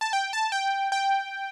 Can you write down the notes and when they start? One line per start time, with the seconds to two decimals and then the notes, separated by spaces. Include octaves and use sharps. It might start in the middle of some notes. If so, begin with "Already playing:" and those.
0.01 A5
0.13 G5
0.33 A5
0.52 G5
0.92 G5